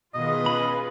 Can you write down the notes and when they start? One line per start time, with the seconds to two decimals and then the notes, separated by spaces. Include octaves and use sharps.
0.14 B2 D#3 F4 G#4 B4 D#5
0.46 C#4 B5